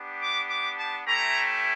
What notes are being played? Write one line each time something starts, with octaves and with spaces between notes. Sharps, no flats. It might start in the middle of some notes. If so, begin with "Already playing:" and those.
Already playing: B3 D4 G4
D6
D6
A5
A3 C#4 E4 G4 A#5